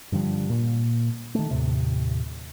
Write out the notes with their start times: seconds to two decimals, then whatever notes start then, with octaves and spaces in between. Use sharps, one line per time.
0.12 G2 D3 F3 G3
0.50 A#2
1.35 D#3 A3
1.51 D#2 A2 C3